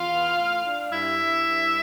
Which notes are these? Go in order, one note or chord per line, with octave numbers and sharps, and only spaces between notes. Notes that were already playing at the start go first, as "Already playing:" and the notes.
Already playing: E2 F4 F5
B3
A2
D4
G2 E4 E5
G2
G2